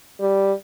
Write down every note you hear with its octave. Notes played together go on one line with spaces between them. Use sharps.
G3